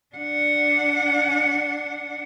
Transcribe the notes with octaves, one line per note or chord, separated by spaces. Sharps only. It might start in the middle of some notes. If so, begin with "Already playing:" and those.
D4 F#5